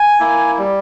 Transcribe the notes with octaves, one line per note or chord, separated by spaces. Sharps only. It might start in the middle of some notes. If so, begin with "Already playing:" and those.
Already playing: G#5
A#3 E4
G3